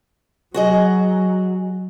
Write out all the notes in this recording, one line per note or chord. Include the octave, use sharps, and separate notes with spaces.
F#3 F#4 G#4 D#5